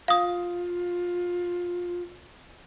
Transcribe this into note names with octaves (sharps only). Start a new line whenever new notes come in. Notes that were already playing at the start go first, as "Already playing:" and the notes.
F4 F5 D#6